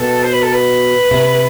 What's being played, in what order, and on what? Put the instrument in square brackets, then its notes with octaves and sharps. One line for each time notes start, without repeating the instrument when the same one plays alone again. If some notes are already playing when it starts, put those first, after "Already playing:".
Already playing: [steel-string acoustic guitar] B2 [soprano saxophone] A4
[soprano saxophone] C5
B4
A4
B4
[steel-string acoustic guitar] C3